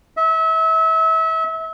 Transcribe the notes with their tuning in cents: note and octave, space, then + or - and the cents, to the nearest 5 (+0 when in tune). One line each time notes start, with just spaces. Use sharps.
E5 -30